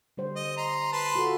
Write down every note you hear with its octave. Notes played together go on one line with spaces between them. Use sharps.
D3 G3 C5
D#5
A#5 C6
B4 A5 C6
F4 F#4 A4